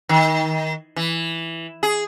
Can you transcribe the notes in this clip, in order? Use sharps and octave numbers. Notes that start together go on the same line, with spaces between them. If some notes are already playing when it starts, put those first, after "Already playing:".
D#3
E3
G#4